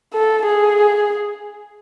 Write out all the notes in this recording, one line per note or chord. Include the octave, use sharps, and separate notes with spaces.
A4
G#4